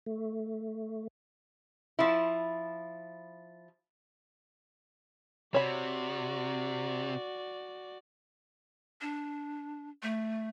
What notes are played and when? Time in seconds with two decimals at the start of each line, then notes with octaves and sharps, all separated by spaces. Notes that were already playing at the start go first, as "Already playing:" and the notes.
0.06 A3
1.99 F3 E4
5.54 C3 F#4 C#5 D5 B5
9.01 D4
10.03 A3